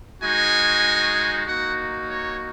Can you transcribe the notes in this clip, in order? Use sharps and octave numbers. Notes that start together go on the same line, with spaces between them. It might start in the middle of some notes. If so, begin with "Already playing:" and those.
G#3 D#4 F#4 G#5
A#3 D#4 F#4 F#5
C#5